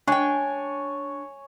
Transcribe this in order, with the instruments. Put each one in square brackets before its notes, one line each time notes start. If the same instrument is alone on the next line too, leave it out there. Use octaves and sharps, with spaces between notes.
[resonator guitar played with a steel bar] D4 G5 [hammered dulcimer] C#5 G#5